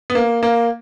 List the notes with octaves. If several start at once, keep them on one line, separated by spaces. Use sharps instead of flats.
B3
A#3
A#3